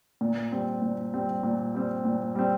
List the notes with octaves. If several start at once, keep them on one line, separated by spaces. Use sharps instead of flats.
A#2
G3 C4
A#2
G3 C4
A#2
G3 C4
A#2
G3 C4